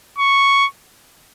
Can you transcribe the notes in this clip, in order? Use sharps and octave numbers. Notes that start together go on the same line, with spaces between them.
C#6